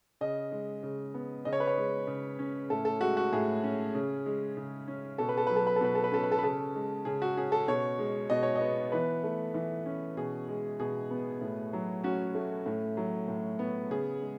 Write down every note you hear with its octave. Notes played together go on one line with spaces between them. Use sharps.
C#3 D#5
G#3
C#3
B3
C#3 D#5
C#5
B4
C#5
G#3
C#3
C#4
A2 A4
A4
G#3 F#4
F#4
A2 G#4
C#4
C#3
G#3
C#3
C#4
B2 A4
B4
A4
F#3 B4
A4
B4
A4
B2 B4
A4
B4
C#4 A4
B4
A4
B4
C#3 A4
G#3
C#3 G#4
F#4
C#4 G#4
A4
B2 C#5
G#3
B2 D#5
C#5
D#5
B3
E3 B4
A3
E3
C#4
B2 G#4
G#3
B2 G#4
B3
A2
F#3
C#4 F#4
A3
A2
F#3
A2
B3
C#3 G#4
G#3